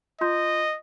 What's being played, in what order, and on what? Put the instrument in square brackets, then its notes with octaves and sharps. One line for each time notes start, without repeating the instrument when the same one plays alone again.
[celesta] F4 C6 G6 [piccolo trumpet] D#5